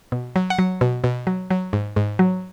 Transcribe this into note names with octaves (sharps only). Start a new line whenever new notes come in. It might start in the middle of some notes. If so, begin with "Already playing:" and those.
B2
F#3
F#5
F#3
B2
B2
F#3
F#3
G#2
G#2
F#3